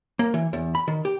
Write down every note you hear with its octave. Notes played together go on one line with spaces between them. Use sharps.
A#3
E3
E2
B5
D#3
G4